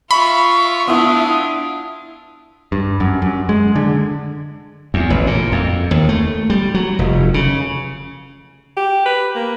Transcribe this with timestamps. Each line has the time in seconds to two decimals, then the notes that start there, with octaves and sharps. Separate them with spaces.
0.11 F4 E5 B5 C#6
0.88 B3 D4 E4 F4 D#6
2.72 G2
3.00 F#2
3.22 F#2
3.49 G#3
3.76 D3
4.94 E2
5.10 A1
5.27 A#2
5.52 F2
5.91 D#2
6.09 A3
6.50 G3
6.74 F#3
6.99 F1
7.34 C#3
8.77 G4
9.06 B4
9.35 A#3